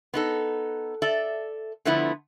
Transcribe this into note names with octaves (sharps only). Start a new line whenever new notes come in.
B3 D#4 A4
A4 D5 E5
D3 F3 A3 B3 E4